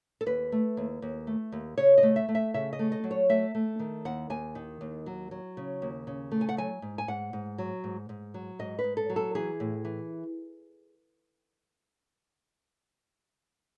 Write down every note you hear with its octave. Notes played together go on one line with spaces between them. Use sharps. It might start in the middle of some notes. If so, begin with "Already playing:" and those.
A4
D#2 B4
A3
D#2
D#2
A3
D#2
C#3 C#5
D#5
A3
E5
A3
E5
C#3 E5
D#5
A3
D#5
F#3
C#5
A3 E5
A3
D#3
D#2 F#5
D#2 G#5
D#3
D#2
F#3
F#3
C#3
D#2
C#3
A3
G#5
F#5
F#3 G#5
G#2
G#5
G#2 F#5
G#2
F#3
G#2
G#2
F#3
G#2 D#5
B4
G#2
A4
F#3
A4
E3 G#4
A2
E3